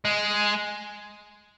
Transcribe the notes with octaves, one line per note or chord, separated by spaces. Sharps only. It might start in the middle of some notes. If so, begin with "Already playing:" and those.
G#3